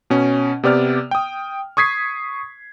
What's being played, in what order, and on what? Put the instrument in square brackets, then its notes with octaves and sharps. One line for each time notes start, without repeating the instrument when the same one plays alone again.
[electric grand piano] B2 C#4
C3 B3 G4 D5 D6 F6
G5 D#6
C#6 D#6 G#6 B6 C7